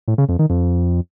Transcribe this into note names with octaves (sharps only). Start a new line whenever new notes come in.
A2
C#3
F2
D#3
F2